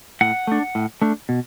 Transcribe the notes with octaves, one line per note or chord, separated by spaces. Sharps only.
A2 F#5
A3 D4
A2
A3 D4
B2